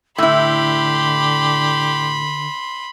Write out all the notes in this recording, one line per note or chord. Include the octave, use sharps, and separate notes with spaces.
A2 D3 E4 G4 B5 C6